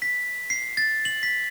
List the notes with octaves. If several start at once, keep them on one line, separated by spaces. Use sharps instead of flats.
B6
C7
A6
F#7
B6